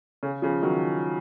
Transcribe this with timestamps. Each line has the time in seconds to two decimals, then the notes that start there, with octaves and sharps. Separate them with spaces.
0.23 C#3
0.42 C#3 F3
0.62 D#3 F#3